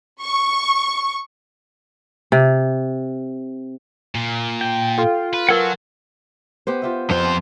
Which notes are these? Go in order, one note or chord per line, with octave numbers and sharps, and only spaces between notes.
C#6
C3
A#2
G5
F4 A4
B4
F#3 A#4 B4 F#5 G#5 A5
B3 G4 C5
F4 G4 E5
F2 C5